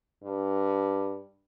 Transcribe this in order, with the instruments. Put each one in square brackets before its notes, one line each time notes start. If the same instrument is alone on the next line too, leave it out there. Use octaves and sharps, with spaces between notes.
[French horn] G2